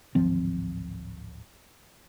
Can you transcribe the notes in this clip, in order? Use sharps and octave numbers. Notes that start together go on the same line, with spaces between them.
D1 G#1 F3 C4